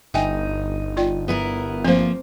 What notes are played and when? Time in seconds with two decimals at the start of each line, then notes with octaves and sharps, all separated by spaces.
0.14 G1 D#4 E5 G5 G#5
0.97 F4 D5 G5
1.28 B3 E4 A#4
1.84 F3 A#3 C4 C5